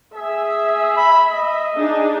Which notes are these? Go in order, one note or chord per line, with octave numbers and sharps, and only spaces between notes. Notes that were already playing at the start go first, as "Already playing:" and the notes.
G#4 E5
B5
D#5
D4 D#4 G#4